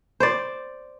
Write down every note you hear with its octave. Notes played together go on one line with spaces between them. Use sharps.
C5 D5